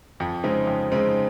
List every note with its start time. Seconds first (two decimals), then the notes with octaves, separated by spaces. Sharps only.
0.20 F2
0.44 C#3 G#3 C4 D#4
0.67 F2
0.91 C#3 G#3 C4 D#4